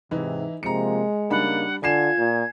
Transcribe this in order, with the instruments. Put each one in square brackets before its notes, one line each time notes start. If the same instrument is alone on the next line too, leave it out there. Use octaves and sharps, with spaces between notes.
[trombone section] G#2 C3 [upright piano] E3 D#4 E4
[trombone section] C3 F3 A#3 [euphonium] G#3 [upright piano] A#5 C#7
[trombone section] C#3 A#3 D#4 [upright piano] G3 D4 B5 [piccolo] F#5
[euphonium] D3 [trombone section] F4 [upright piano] G#5 C7 E7 [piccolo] G#6
[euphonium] A#2